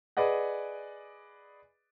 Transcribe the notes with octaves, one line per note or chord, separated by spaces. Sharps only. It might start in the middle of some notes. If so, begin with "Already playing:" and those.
G#4 B4 D5 D#5 F#5